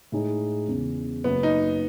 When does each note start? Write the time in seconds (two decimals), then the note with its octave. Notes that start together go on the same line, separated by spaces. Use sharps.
0.12 A2 G#3 D#4 G#4
0.68 E2 C#3 G#3
1.24 F#1 F#2 C#3 B3
1.43 D#4